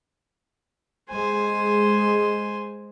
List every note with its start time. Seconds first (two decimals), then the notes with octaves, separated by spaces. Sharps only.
1.10 G#3 C5 G#5